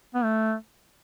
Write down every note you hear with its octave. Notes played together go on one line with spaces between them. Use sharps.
B3
A3